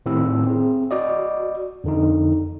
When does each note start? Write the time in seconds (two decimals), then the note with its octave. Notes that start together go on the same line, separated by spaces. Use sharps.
0.06 A2 D#3 C4 E4 G4 E6
0.47 C4 G#4
0.91 F#4 D5 D#5
1.84 F2 D3 D#4